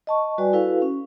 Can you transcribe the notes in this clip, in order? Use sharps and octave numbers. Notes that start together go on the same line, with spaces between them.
D#5 A5 C#6
G3 F#4 B4 D5 G#5
E4 F#4 A4 B4 F5
C#4